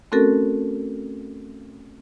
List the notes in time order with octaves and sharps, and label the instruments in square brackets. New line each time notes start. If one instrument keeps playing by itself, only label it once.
[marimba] A3 C4 C#4 F#4 A4 A#4